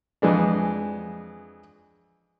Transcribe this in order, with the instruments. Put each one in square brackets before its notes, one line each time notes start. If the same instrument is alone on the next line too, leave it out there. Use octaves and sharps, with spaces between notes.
[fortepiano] F2 E3 G#3 D4